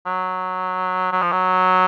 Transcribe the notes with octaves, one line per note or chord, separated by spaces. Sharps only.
F#3
F#3
F3
F#3